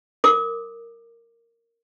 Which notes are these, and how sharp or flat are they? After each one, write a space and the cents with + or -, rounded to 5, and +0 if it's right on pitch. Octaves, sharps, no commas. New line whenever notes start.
A#4 -10 D6 +25